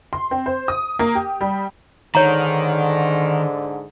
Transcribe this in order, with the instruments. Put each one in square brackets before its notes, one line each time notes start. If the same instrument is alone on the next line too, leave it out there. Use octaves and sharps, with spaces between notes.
[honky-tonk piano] C6
C4
C5
D#6
A#3
G4
G3
[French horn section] G#2 D3 [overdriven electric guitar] D#3 [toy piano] C#5 A#5